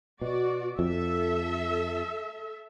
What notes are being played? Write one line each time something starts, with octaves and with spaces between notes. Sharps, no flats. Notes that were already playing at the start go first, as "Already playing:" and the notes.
B2 F#4 D5
F2 A4 E5